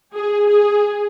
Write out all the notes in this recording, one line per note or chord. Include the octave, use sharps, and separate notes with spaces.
G#4
G#4